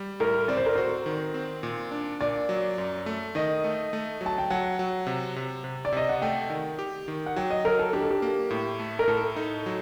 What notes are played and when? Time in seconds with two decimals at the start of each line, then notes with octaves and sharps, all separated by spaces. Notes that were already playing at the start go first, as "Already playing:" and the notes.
Already playing: G3
0.20 A2 A#4
0.48 C4 D5
0.57 C5
0.66 A#4
0.75 F#4 C5
1.06 D#3
1.34 C4
1.63 A#2
1.91 D4
2.21 A#2 D5
2.49 F#3
2.78 F#2
3.06 A3
3.35 D#3 D#5
3.64 A3
3.93 A3
4.21 F#3
4.26 A5
4.38 G5
4.50 F#3 F#5
4.79 F#3
5.07 C3
5.36 C3
5.64 C3
5.85 D5
5.93 C3 D#5
6.09 F#5
6.22 A3 G5
6.50 D#3
6.79 G4
7.08 D#3
7.26 F#5
7.36 F#3 G5
7.50 D#5
7.65 F#3 A#4
7.79 A4
7.93 D4 G4
8.03 A4
8.11 G4
8.22 A#3
8.50 A2
8.80 A3
8.99 A#4
9.08 A2 A4
9.36 D#4
9.66 F#3